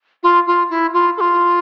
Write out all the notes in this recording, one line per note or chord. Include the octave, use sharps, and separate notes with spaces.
F4
F4
E4
F4
A4
F4